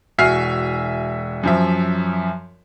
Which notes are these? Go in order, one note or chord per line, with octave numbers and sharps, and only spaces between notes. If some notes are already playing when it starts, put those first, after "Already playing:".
E1 F#4 E5 G#5 F6 C7
F#2 F3 E5